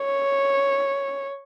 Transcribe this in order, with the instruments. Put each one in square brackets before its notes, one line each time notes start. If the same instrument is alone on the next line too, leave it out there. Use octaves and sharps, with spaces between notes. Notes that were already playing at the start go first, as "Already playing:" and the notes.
Already playing: [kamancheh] C#5